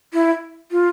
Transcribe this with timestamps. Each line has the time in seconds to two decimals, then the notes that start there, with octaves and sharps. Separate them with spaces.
0.13 E4
0.71 F4